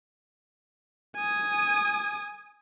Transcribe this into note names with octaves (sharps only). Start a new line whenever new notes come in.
G#5 D#6